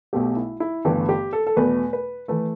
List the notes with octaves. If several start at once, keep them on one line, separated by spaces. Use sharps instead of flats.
B1 B2 A3 G4
E4
E4
G1 G2 E3 A3 G4
G4
A4
A4
E2 B2 A3 B4
B4
E3 A3 B4